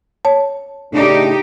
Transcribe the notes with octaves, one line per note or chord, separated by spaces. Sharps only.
C#5 A5
A2 C#3 D4 D#4 G4